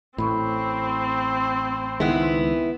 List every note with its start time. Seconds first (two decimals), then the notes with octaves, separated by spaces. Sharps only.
0.18 A1 A2 C4 B5 C#6
2.00 C#2 D#3 G#3 B3 E4